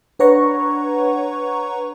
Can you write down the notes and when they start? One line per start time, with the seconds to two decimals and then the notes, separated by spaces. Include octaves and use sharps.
0.19 D4 B4 C#5 F#5 A#5 C#6